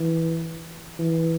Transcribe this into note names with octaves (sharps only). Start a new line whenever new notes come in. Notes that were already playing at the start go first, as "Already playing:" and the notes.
Already playing: E3
E3